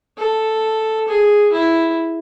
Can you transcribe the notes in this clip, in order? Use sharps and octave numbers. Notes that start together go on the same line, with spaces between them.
A4
G#4
E4